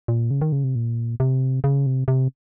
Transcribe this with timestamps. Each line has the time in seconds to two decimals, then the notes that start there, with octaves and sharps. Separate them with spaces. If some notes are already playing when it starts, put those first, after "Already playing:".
0.08 A#2
0.31 C#3
0.41 D#3
0.52 C#3
0.64 C3
0.75 A#2
1.20 C3
1.64 C#3
1.86 C3
2.08 C3